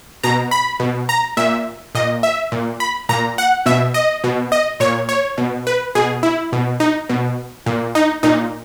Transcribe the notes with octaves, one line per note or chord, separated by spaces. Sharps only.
B2 A#5
B5
B2
A#5
A#2 E5
A#2 D#5
E5
A#2
B5
A#2 A#5
F#5
B2 E5
D#5
B2
D#5
A#2 C#5
C#5
B2
B4
B2 G#4
E4
B2
D#4
B2
A#2
D#4
A#2 D#4